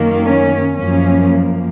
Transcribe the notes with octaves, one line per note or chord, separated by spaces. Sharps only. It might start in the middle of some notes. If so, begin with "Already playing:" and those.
Already playing: F#2 D#3 A#3
C#4
F#2 F3 A#3 C#4